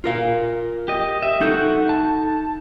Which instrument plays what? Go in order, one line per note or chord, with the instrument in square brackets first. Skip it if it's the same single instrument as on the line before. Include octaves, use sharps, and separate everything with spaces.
[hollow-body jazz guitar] F4 A#4 F5
[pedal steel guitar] G4 D#5
E5
[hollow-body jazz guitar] D#4 A4 [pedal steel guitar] F#4 G6
[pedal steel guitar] A5